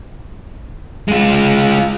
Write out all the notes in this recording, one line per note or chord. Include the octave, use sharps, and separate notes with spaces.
G#3 F4